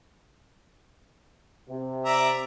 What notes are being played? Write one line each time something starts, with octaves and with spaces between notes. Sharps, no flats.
C3
D5 E5 A#5